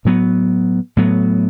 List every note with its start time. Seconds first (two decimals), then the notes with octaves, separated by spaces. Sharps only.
0.05 A2 F#3 B3
0.97 A2 F#3 B3